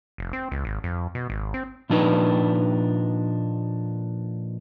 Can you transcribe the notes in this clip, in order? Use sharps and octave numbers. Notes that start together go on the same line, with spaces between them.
F1
C4
C#2
G#1
F2
B2
G#1
C4
A#2 F3 D4 D#4 B4